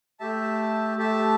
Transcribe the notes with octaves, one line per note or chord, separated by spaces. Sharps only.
A3 G4 E5 A5
A3 G4 E5 A5